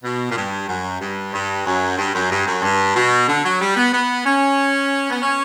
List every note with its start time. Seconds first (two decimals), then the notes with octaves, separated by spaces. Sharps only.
0.03 B2
0.30 A#2
0.35 G2
0.68 F#2
1.01 G2
1.33 G2
1.65 F#2
1.97 G2
2.14 F#2
2.30 G2
2.46 F#2
2.62 G2
2.95 B2
3.27 D3
3.44 F#3
3.60 G3
3.76 B3
3.92 B3
4.25 C#4
5.10 B3
5.22 C#4